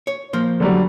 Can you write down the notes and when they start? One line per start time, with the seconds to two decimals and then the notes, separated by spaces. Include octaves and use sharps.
0.07 C#5
0.33 F3 A#3 C5
0.60 D3 F#3 G3